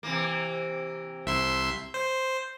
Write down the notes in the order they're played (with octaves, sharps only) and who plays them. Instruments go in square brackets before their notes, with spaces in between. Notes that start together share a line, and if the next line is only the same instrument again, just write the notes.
[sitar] C3 E3 A#3
[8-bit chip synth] C2 E5 C6
C5